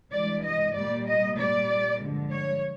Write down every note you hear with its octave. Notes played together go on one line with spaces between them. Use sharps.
G2 E3 G#3 D5
D#5
A#2 G3 D5
D#5
A#2 G3 D5
G2 D3 F3 G#3
C#5